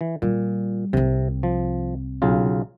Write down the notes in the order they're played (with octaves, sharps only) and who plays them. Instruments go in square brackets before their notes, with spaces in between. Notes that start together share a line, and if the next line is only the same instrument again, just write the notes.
[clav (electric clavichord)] E3
[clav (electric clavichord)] A#2 [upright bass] G3
[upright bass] C2 C4 [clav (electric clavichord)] C3
[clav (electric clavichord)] F3
B1 C#3 F4